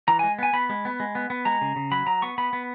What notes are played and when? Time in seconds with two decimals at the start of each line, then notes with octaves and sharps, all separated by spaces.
0.08 E3 A#5
0.19 G#3 G#5
0.39 B3 G#5
0.53 B3 B5
0.69 G#3
0.85 B3
1.00 G#3
1.15 B3
1.30 B3
1.45 G#3 A#5
1.61 C#3
1.76 C#3
1.91 F#3 B5
2.06 F#3 A#5
2.22 B3 C#6
2.38 B3 B5
2.53 B3